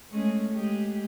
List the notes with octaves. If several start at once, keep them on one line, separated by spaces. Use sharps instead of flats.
G#3 A3 C#4
G#3 G4